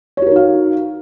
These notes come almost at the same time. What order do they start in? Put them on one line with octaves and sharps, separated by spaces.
C#5 F#4 A#4 D#4 F5